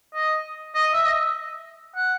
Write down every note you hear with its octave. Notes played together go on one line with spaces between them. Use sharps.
D#5
D#5
E5
D#5
F#5